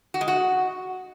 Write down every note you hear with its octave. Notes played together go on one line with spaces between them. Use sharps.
F#4
G#3
F#4